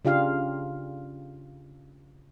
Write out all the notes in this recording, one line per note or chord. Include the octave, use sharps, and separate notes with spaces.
C#3 D4 F4 G4 F5